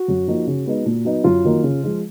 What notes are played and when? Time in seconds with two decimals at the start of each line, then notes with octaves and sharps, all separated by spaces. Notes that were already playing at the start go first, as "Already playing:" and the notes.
Already playing: F#4
0.08 F#2
0.28 F3 A#3 D#4
0.47 C#3
0.66 G#3 B3 D#4
0.85 A#2
1.05 F#3 B3 D#4
1.24 F#2 F4
1.44 D#3 F#3 A#3 D#4
1.63 C#3
1.83 F3 G#3